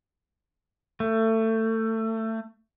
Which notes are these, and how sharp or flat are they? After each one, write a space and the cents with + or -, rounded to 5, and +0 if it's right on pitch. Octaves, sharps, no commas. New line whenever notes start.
A3 +25